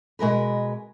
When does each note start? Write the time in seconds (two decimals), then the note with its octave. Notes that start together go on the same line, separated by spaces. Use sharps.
0.19 B2 G#3 A#4 B4